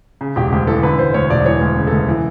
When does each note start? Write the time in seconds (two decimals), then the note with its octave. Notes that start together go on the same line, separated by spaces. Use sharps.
0.21 C#3
0.36 E1 G4
0.52 D2 G4
0.67 E3 A4
0.83 D3 B4
0.99 E1 C5
1.14 D2 C#5
1.30 E1 D5
1.45 E3 C#5
1.61 D2
1.77 C#3
1.87 A4
1.92 D2
2.08 E3